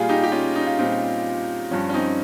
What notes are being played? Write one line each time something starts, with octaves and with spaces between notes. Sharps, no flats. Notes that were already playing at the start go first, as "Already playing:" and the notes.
Already playing: A#2 G3 F4 G#4
D#4 G4
G4
C#4 F4
D#4
F4
A#2 G3 C4 D#4
G2 F3 C#4
C#4
C4 D#4